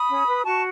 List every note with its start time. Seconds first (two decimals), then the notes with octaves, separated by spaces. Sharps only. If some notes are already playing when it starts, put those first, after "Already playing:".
Already playing: B5 D#6
0.09 C#4
0.26 B4
0.44 F#4 A5 C#6